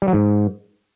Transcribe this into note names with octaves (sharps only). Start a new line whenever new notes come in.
G3
F#3
G#2